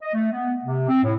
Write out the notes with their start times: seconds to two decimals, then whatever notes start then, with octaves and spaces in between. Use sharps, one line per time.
0.02 D#5
0.14 A3
0.32 B3
0.64 C3
0.89 C4
1.03 A2